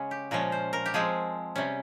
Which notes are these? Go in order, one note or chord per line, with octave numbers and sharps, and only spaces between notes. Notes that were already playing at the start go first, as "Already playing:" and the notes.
Already playing: C#3 G#3 C#4
G4
A#2 F3 G#3 C#4 A#4
C5
A#4
G4
F3 G#3 C4 G#4
C3 G3 C#4